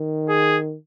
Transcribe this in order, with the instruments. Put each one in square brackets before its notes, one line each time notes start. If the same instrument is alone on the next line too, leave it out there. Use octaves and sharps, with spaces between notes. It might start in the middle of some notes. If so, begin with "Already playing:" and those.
Already playing: [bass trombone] D#3
[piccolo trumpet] G#4